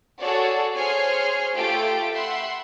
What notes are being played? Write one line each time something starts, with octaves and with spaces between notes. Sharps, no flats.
F#4 G#4 A4 C#5 D5
G#4 C5 C#5 G#5 C6 F6
A3 F4 G4 G5 D7
E5 F#5 B5 C6